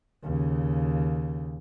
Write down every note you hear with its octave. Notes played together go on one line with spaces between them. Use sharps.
D#2 C#3